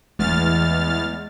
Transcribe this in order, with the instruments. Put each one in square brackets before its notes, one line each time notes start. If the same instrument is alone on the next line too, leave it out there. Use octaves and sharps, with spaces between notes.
[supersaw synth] E2 F6 A6 [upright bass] F#3 A3 [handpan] G#3